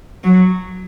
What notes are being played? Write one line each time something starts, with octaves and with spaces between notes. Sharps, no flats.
F#3